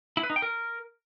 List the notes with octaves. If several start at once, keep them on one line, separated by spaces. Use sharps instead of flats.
E4
B4
D#4
G5
A#4